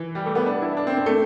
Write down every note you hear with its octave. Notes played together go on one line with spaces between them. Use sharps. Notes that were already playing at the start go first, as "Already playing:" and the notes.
Already playing: E3
G3
A3
B3
D4
E4
D4
C4
C4
A3